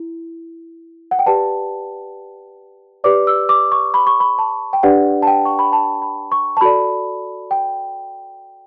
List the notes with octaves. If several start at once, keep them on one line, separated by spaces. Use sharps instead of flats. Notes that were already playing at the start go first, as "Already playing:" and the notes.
Already playing: E4
F#5
G5
G4 B4 D5 A5
G4 B4 D5 D6
E6
D6
C#6
B5
C#6
B5
A5
G5
D4 G4 B4 D5 F#5
A5
G5
C#6
B5
A5
B5
C#6
A5
F#4 A4 D5 B5
G5